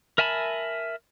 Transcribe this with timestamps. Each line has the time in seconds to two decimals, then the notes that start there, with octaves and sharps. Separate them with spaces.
0.18 A#4 E5 G#5 A5 B5